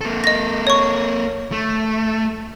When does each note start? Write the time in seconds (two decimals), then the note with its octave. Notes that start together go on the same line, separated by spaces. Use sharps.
0.01 A#3 A4
0.24 D#5 A#6
0.67 C#5 C#6
1.52 A3